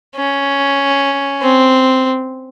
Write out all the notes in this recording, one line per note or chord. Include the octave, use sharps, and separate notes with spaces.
C#4
C4